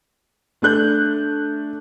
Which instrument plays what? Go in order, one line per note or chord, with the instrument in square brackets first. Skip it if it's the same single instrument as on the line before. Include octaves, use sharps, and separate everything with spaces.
[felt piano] A3 D4 F#6 G6